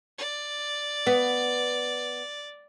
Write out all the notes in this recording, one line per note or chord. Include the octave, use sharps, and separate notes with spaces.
D5
B3